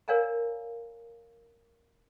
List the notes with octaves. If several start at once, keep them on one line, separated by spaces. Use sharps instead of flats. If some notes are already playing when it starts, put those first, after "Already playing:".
A#4 C#5 D5 F5 G#5 A#5